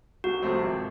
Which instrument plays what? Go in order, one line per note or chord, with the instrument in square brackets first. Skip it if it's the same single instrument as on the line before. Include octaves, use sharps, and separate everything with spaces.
[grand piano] C2 [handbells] F#4
[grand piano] C3 F3 A3 C4
G#1